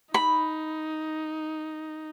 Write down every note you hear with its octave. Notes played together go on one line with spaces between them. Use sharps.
D#4 B5